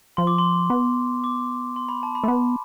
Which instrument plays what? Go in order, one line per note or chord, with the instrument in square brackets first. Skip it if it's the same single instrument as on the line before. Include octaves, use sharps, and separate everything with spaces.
[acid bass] F3 [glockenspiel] C6
[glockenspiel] D6
C6
[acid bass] B3
[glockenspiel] D6
C6
B5
A5
B5
[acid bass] A3
[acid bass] B3 [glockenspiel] B5